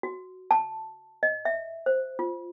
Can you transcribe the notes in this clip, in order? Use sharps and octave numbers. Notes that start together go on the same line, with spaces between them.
F#4
A5
D#5
E5
C5
F4